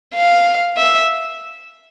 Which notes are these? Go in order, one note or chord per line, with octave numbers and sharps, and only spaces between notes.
F5
E5